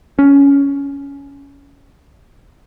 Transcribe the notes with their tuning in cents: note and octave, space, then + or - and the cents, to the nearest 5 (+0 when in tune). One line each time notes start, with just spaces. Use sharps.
C#4 +15